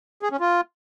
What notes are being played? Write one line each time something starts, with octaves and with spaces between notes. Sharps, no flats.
G#4
C#4
F4